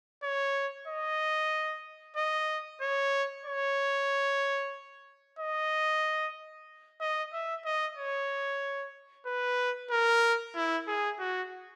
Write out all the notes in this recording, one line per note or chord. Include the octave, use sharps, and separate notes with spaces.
C#5
D#5
D#5
C#5
C#5
D#5
D#5
E5
D#5
C#5
B4
A#4
E4
G#4
F#4